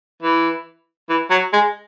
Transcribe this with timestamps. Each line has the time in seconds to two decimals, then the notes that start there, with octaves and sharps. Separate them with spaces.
0.22 E3
1.09 E3
1.30 F#3
1.53 G#3